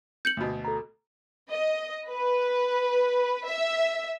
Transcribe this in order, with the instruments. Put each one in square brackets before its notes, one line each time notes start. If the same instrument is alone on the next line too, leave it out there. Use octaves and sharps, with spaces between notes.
[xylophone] G6 C#7 F#7
[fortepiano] D2 B2
[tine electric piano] A4 A#5
[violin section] D#5
B4
E5